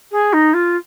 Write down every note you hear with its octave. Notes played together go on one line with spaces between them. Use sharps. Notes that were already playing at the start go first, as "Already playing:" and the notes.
G#4
D#4
F4